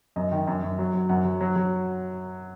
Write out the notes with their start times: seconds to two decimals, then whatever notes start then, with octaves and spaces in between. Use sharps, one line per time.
0.16 F#2 D#5
0.32 D#3
0.47 F#2
0.63 F#2
0.79 F#3
0.94 F#3
1.09 F#2 F#5
1.25 F#3
1.41 F#3
1.56 F#3